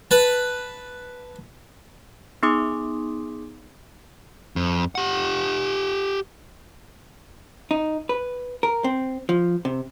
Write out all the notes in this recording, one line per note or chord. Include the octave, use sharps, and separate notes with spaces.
B4 A5
B3 D#4 G#4 C6 D6 D#6
F2
G4 F#5
D#4
B4
A#4
C4
F3
C3